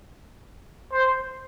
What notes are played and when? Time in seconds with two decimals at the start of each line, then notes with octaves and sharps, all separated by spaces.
0.92 C5